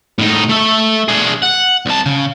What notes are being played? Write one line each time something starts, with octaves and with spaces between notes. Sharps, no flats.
A2 D#4
A3 E5
D4 G#4
F#5
C2 A5
C#3